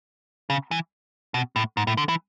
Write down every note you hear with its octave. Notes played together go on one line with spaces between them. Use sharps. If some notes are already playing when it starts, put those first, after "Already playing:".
C#3
E3
B2
A2
G#2
A2
D3
E3